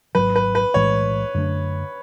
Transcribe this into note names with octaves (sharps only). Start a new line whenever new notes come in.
G#1 G#2 F#3 B4
B4
B4
B1 A2 E3 G#3 C#5
F#2 D3 A3 D4